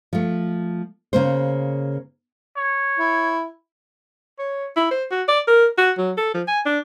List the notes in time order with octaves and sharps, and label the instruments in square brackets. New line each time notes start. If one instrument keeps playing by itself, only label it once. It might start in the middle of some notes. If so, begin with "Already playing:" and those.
[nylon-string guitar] F3 A3
C#3 A#3 C5
[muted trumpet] C#5
[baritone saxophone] E4
[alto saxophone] C#5
E4
C5
F#4
D5
A#4
F#4
F#3
A4
F3
G#5
D4